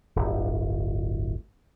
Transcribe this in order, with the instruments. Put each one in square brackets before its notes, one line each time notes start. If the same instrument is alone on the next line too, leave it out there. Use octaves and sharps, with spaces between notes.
[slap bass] D1 G1